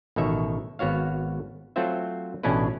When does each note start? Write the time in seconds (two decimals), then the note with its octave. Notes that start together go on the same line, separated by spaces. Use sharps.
0.16 A1 B2 D#3 C#5 E5
0.79 G#1 B3 F#4 C#5 F5
1.76 F#3 A3 C4 F4 C5 E5
2.43 A1 B2 C#4 D4 E4 B4